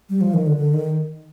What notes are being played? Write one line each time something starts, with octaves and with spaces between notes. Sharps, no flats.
G3
F3
D#3
D3
D3
D#3